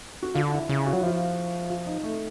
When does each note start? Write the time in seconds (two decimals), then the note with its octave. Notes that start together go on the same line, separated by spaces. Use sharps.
0.22 F#4
0.35 D3 F4
0.52 E4
0.69 C#3 E4
0.86 F#4
0.93 F#3 F4
1.00 E4
1.03 F3 F4
1.70 F4
1.87 D#4
2.04 A3